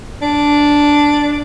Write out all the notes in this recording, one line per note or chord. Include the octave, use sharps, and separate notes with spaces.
D4